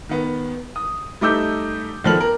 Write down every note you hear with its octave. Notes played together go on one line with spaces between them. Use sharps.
D#3 B3
D#6
G3 A3 D#4 D6 E6 G6
E1 D#3 F3 A4 F6 F#7
A#4